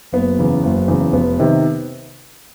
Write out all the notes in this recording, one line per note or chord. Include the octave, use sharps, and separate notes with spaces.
F#1 B3
E2 C#3
F#1
E2 C#3
F1 B3
C3 D#3